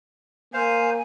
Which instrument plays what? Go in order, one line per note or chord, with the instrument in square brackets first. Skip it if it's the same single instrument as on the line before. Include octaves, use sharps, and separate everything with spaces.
[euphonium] A#3 [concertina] C5 F5 [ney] G#5